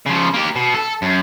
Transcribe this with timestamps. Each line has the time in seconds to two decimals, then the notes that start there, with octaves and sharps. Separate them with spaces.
0.06 C#3 F3
0.34 A#3 G4
0.55 B2
0.74 A4
1.02 F#2